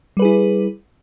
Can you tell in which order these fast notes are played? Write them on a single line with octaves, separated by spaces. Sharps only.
G3 B4 G#4 E4